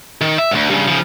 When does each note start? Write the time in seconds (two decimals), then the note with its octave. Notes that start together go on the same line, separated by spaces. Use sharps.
0.21 D#3
0.38 E5
0.51 D2 G2
0.70 G2 C#3
0.88 C#3 F3